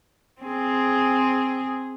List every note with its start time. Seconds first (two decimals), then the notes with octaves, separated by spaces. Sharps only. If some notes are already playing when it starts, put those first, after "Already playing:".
0.42 C4 G#4